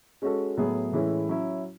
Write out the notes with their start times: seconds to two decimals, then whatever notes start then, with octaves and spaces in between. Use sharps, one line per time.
0.22 G#3 C#4 F#4 A4
0.57 A2 F#3 B3 E4 G#4
0.92 A2 E3 G#3 C#4 E4
1.29 F#3 C#4 E4